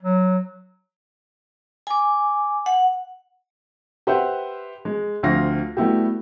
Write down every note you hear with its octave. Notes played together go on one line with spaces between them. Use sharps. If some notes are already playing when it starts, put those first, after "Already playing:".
F#3
G#5 D6
F#5
G4 B4 C5 E5 F#5
G#3
D2 F3 C4 F4 F5 A#6
G3 A3 B3 E4 F#4 G4